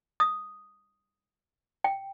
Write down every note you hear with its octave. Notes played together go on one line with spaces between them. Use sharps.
D#6
G5